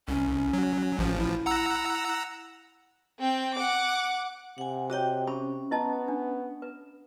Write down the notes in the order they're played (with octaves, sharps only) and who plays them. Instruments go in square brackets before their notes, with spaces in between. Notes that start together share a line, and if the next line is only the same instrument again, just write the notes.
[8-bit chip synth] C2 [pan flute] C#4
[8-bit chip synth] F#3
[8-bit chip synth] A1 F3 [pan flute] C#4
[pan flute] E4
[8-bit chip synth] F#5 A#5 E6
[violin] C4 G5
F#5 D6
[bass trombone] C3 [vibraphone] F#5 G#5
[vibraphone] F#4 D#5 G5 [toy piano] G#4 C#5
[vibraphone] C#4 [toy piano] G#4 B5
[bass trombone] B3 [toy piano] E4 D#5 A5
[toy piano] D4
B4